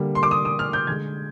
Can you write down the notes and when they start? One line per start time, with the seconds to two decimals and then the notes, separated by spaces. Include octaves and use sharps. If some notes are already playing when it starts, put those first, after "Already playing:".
Already playing: D3 G3 A#3
0.15 C6
0.23 D6
0.31 D#6
0.45 D#6
0.59 F6
0.73 G6
0.87 D3 G#3 G#6